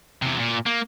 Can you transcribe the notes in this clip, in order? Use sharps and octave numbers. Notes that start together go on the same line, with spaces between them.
E2 C3
A#2
A#3